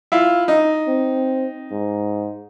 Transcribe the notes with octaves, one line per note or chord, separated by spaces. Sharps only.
E4 F4
D#4
C4
G#2